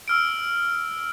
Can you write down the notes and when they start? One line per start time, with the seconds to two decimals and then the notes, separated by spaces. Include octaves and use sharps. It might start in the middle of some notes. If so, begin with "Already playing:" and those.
0.08 E6 F6 D7